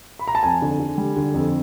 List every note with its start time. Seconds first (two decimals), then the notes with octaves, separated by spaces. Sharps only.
0.19 B5
0.28 A#5
0.35 A5
0.43 F2 G#5
0.62 D3
0.80 D3
0.98 G3
1.16 D3
1.34 F2